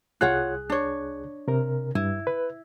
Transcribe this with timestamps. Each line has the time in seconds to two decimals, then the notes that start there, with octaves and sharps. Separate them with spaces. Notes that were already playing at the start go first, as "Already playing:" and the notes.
0.21 C2 F4 G#4 C#5 F#5 F#6
0.70 D4 C#5
1.48 C3 A#4
1.95 G2 E4
2.27 B4